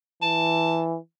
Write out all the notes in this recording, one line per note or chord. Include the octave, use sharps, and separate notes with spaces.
E3 A5